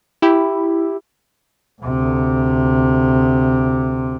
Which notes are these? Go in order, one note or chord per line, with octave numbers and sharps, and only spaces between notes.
E4 G4
D2 C3